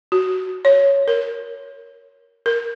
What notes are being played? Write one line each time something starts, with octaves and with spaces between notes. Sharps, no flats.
F#4
C#5
A#4
A#4